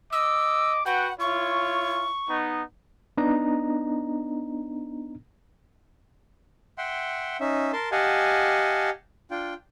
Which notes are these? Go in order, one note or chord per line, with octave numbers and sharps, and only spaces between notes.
D#5 D6 E6
F#4 B4 F#5 G5
E4 F4 C#5 C#6
B3 D#4
B3 D4 D#4 D#5 A#5
E5 F#5 G5 C6
C#4 D#4 E5
A#4 A5 C6
G4 D#5 F5 F#5 G#5 A5
D4 F4 G5